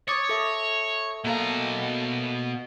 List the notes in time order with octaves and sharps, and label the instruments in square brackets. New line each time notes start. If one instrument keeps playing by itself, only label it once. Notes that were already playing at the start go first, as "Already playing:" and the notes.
[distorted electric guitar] C#5 [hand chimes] D6 D#6 A6
[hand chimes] A4 E5
[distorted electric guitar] B2 A#5 [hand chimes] A#3 A4 F5